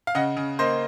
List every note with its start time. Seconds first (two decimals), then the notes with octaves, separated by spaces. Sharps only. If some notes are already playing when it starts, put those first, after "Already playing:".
0.07 F5
0.15 C#3 D#5 F#5
0.37 C#3
0.59 A#3 C5 D#5